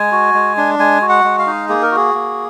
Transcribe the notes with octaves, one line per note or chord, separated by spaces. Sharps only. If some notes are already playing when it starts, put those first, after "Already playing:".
Already playing: G#3 G#5
F#4
G#3
D4
G#3 G#5
F#4
F#5
G#3
F5
D#4
A#3 G#4
A#4
F#4 G#4
A#3